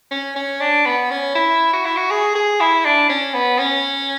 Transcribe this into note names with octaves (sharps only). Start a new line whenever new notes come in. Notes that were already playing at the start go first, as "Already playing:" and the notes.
C#4
C#4
D4
B3
C#4
E4
F#4
E4
F#4
G#4
G#4
E4
D4
C#4
B3
C#4